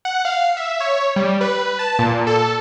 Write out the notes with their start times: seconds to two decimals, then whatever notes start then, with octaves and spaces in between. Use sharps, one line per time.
0.05 F#5
0.25 F5
0.57 E5
0.80 C#5
1.16 G3
1.41 B4
1.79 A5
1.99 A#2
2.27 A4